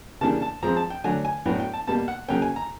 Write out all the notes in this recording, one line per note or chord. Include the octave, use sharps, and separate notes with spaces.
C#3 E3 G3 A#3 D4 A5
A5
F3 G#3 C4 A#5
A5
G5
D3 F#3 A3 D4 G#5
G#5
A2 F#3 B3 D4 G5
G5
A5
B2 G3 A#3 A5
F#5
C#3 F#3 A#3 C#4 G5
G#5
A#5